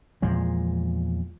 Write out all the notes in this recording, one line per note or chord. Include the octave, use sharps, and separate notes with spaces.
E2 A#2 F3 G#3